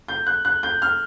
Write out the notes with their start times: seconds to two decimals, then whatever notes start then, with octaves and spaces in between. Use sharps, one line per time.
0.08 G6
0.27 F#6
0.45 F#6
0.63 G6
0.82 F6